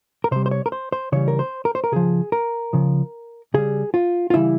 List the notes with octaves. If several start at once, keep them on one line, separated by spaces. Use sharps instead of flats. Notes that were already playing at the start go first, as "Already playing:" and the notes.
A#4
C3 G3 C5
C5
C#5
A#4
C5
C5
C#3 E3 G3 C#5
A#4
C5
A#4
C5
A#4
C#3 F3 G#4
A#4
C#3 F3
C#3 G3 G#4
F4
F4
C#3 E3 G3 E4